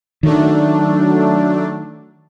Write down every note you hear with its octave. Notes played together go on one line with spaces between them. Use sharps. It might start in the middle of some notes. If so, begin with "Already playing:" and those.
D#3 F#3 A3 D4